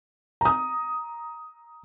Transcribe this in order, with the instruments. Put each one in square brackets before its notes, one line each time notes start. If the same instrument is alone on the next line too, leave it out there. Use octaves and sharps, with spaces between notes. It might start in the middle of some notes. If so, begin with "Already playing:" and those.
[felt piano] A#5 D#6